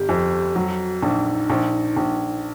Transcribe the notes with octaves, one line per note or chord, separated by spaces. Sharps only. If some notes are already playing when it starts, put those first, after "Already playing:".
Already playing: G1 G4
F2
F#3 F#4
A#1 D#4
A#1
A#1